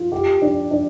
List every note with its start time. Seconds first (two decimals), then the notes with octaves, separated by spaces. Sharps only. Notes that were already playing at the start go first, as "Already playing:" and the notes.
Already playing: F4
0.12 G4
0.42 D4
0.71 D4